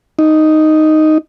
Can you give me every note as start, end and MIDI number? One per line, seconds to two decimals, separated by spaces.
0.19 1.18 63